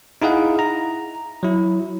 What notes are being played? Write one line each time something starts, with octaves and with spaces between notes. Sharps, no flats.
D#4 E4 G#4 F5 F#5
A#5
F#3 E4